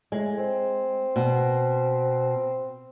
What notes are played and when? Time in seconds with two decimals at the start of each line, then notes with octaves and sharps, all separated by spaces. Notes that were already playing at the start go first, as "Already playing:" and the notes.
0.12 A2 G#3
0.38 C4
1.16 B2